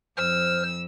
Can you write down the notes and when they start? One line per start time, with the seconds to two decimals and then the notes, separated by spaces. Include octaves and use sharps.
0.17 F2 C5 E6 F6